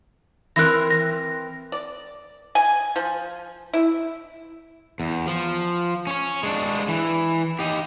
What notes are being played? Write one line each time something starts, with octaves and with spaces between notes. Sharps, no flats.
E3 C4 A#4 F#6 A#6
A#6
D5
G#5
F3
E4
E2
F3
C#4 C#5
G#3 D4
E3
D#4 G4